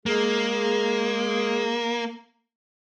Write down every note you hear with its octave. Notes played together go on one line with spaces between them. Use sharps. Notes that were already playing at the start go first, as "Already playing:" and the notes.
G#3 A#3 G#4